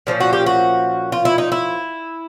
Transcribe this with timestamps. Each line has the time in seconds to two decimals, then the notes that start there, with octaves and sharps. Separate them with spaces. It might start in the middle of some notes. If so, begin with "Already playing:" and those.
0.07 A#2 F3 A#3 C#4
0.20 F#4
0.33 G4
0.46 F#4
1.12 F4
1.25 E4
1.38 D#4
1.52 E4